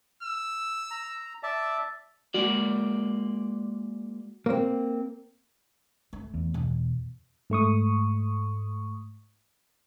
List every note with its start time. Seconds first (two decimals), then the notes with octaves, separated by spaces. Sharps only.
0.23 E6
0.91 A#5
1.43 D5 E5 A5
2.34 G#3 A#3 F#4 D5
4.46 A#3 C4
6.13 A3
6.34 E2
6.54 B2
7.50 G#2 A3 C#6 D#6